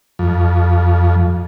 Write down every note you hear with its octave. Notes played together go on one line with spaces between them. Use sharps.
F2